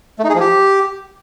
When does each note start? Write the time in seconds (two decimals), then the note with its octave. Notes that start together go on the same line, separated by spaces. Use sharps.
0.19 A3
0.24 D#4
0.30 G#4
0.35 F3
0.40 G4